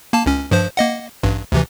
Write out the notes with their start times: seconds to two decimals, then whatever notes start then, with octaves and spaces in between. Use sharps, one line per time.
0.13 A#3 A5
0.26 C#2 C#4
0.51 G2 F3 C5
0.77 A#3 D#5 F#5
1.23 A1 G2
1.52 D2 C3 E3